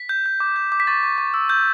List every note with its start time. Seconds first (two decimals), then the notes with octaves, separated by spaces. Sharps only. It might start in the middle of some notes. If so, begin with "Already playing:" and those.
Already playing: B6
0.09 G6
0.26 G6
0.40 D6
0.56 G6
0.72 D6
0.80 B6
0.87 C#6 A6
1.03 C#6
1.18 C#6
1.34 E6
1.49 G6